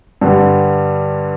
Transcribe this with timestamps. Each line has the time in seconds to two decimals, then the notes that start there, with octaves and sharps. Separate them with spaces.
0.21 G2 D3 G3